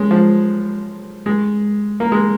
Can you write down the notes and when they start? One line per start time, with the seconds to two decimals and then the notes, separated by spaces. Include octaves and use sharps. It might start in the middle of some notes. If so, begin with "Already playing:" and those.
Already playing: G#3 C#4
0.11 F3
1.26 G#3
2.00 A#3
2.12 G#3